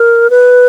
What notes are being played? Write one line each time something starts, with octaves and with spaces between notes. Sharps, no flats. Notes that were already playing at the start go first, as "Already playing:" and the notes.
Already playing: A#4
B4